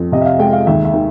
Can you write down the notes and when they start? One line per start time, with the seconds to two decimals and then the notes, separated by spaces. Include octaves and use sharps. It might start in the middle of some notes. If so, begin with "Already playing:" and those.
Already playing: F2
0.12 C3 D#5
0.21 E5
0.26 F5
0.39 G#3 G5
0.53 F5
0.67 D#2 E5
0.85 E5
0.94 D#3